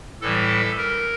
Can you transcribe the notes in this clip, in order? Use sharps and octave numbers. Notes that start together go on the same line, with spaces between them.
A2 E3 G3 A4
A#4